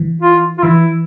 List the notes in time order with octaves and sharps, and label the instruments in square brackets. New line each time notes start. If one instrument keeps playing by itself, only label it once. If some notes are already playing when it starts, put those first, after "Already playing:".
Already playing: [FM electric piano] E3
[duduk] F4
F4
[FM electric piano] E3 [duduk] E4